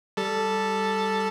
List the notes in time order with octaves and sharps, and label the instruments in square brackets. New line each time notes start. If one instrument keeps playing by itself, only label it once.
[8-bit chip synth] G3 A4 A6